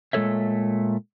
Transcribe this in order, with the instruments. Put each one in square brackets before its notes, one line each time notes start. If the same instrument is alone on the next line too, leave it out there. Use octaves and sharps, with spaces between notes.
[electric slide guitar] A#2 G#3 A3 A4 C#5 E5